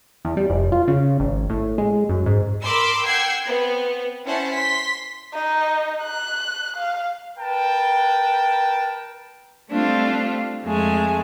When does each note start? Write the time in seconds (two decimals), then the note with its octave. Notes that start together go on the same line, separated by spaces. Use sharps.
0.25 E2
0.37 G3
0.50 F1
0.72 F4
0.88 C#3
1.20 G#1
1.50 A2
1.78 G#3
2.09 F#2
2.26 G#2
2.63 A#4 B5 C6 D6 E6
3.05 F#5 G5 E6 G#6 C7
3.45 B3 C4
4.24 C#4 E4 C5 F#5 A5
4.54 C6 B6
5.34 D#4
6.03 F#6
6.77 F5
7.38 A#4 B4 G5 A5
9.70 G3 A3 C4 D4 F4
10.65 F2 G#3 A3 G#5